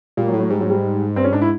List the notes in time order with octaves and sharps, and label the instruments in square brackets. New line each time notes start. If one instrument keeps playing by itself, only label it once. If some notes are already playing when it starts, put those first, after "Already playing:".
[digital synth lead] A#2 [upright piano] G3
[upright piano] F#3
[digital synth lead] A2
[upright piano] F#3
[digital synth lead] G#2 [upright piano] G3
[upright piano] F#3
G3
[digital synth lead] G2 [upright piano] C4
[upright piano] C#4
[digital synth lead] G#2 [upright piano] D4
[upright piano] E4